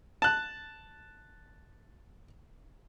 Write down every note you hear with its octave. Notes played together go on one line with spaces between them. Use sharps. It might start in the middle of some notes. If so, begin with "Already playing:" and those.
A5 F#6